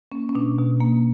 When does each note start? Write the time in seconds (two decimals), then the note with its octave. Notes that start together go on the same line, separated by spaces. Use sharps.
0.12 A#3 C#4
0.29 C#4
0.35 B2 D4
0.58 B2
0.80 A#3